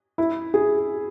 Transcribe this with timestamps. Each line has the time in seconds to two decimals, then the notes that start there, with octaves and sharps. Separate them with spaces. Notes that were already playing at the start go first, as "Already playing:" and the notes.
0.18 E4
0.54 G#4